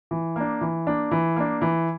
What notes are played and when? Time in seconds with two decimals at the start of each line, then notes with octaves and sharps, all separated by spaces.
0.11 E3
0.36 A#3 D4
0.61 E3
0.87 A#3 D4
1.11 E3
1.36 A#3 D4
1.62 E3